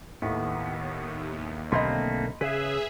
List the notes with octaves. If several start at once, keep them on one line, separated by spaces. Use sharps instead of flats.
D#2 A2 B3
B1 D3 A3 A#3 C4 D#5 B5 C6
C#3 G#4 B4 E5 B6